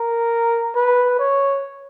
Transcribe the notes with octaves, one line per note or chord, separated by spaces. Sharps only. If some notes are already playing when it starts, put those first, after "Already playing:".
Already playing: A#4
B4
C#5